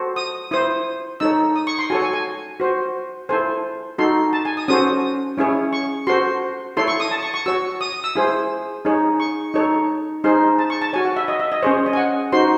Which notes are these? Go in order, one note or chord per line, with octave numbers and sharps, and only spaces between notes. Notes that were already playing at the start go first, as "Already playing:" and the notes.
Already playing: F#4 A4 C5
D#6
E4 C5 D#6
D#4 A4 C#5 E6
D#6
C#6
C6
F#4 A4 C#5 G#5
G#5
G#5
F#4 C5
E4 A4 C5 G#5
D#4 F#4 A4 C6
A5
G#5
D#6
C#4 F#4 A4 C5 D#6
C#4 E4 G#4 C#5
C#6
F#4 A4 C5 C6
E4 A4 C#5 C6
C#6
D#6
A5
C#6
C#6
F#4 C#5 E6
D#6
D#6
E6
E4 G#4 C5
D#4 G#4 C#5
C#6
D#4 A4 C#5
D#4 G#4 C5 C6
A5
C#6
A5
F#4 C#5 G#5
F#5
E5
D#5
E5
D#5
C#4 G#4 C5 C#5
D#5
G#5
F#5
D#4 F#4 C5 C6